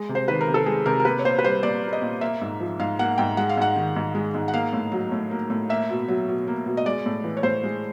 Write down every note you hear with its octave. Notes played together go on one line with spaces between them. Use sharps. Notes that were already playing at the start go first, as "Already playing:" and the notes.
Already playing: G#3
C3
C5
D#3 B4
A#4
C3
A4
G#3 G#4
C3 A#4
A#4
A#3 B4
C#5
A#2 C5
B4
G3 C5
A#2 D5
A#3
D#5
A#2
A#3 E5
G#2
F3
G#2 F5
A#3 F#5
G#2 G5
G#3 F#5
F5
G#2 F#5
D#3
G#2
G#3
G#2
F#5
A#3 F5
A2
F#3
A2
A#3
A2
A#3 E5
B2
F#3
B2
A#3
B2
D#5
G#3 D5
A2
E3
C#5
A2 C5
G#3